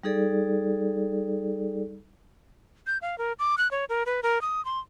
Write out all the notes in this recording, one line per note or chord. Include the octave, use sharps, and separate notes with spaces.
G3 D#4 G#4 A4 D5
G6
F5
A#4
D6
F#6
C#5
A#4
B4
A#4
D#6
C6